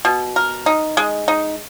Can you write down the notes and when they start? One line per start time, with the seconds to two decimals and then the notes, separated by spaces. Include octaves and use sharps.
0.05 B2
0.36 A#4
0.66 D#4
0.97 G#3
1.28 D#4